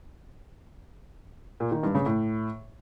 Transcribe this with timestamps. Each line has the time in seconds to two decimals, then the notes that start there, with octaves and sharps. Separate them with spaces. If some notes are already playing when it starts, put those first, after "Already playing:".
1.60 A#2
1.72 D#3
1.83 G2
1.95 C#3
2.06 A2